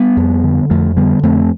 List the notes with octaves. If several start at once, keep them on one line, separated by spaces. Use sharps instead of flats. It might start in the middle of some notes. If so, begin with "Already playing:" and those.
Already playing: G3 B3
F2
D3
F2 F3 A3
D3 G3 B3
F2 A3 C4